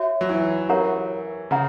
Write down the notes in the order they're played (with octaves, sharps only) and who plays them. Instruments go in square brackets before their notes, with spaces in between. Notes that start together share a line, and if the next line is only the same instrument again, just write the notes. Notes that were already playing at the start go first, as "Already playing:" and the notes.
Already playing: [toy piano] F#4 C#5 E5
[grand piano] F#3
E3
[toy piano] G4 A#4 C#5 F#5 A#5
[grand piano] C#3 [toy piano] F#5 A#5